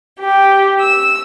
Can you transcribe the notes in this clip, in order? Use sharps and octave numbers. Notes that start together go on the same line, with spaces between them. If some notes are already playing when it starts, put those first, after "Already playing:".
G4
E6